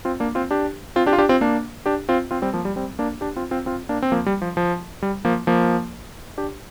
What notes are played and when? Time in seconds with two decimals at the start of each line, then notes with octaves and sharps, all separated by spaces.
0.05 C4 F4
0.20 A#3 D4
0.35 C4 F4
0.51 D4 G4
0.96 C4 F4
1.06 D4 G4
1.13 F4
1.18 D4 G4
1.29 C4 F4
1.41 A#3 D4
1.86 D4 G4
2.09 C4 F4
2.31 C4 F4
2.42 G3 C4
2.54 F3 A#3
2.65 G3
2.76 G3 C4
2.99 A#3 D4
3.21 D4 G4
3.36 C4 F4
3.51 C4 F4
3.66 C4 F4
3.89 A#3 D4
4.02 C4
4.12 F3 A#3
4.26 G3
4.42 F3
4.57 F3
5.02 G3
5.25 F3 A#3
5.47 F3 A#3
6.38 D4 G4